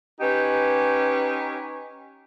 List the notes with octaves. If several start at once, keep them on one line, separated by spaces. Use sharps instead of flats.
C#4 D#4 G4 B4